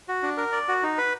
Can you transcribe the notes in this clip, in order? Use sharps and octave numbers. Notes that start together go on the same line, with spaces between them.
F#4
D4
A#4
D5
F#4
D#4
B4